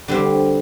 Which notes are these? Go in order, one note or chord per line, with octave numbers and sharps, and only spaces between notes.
D3 G3 C4